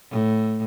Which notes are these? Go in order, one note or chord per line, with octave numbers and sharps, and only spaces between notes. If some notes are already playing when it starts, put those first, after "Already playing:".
A2